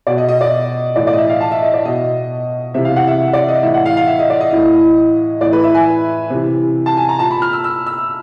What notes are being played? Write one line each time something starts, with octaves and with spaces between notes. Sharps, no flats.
B2 D5
D#5
D#5
D5
A2 E3 D5
D5
D#5
E5
F5
A5
E5
D#5
D5
B2 D#5
C3 E3 E5
F5
F#5
E5
D5
D#5
A2 E3 E5
F#5
F5
F5
E5
D#5
D5
D#5
A2 E3
A2 E3 D5
B4
E5
G#5
C3 E3
A5
G#5
A#5
A#2 A5
B5
F6
E6
E6
E6